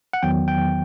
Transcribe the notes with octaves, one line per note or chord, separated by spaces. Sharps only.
F#5
E2 D#3 F#3 B3 G5
G5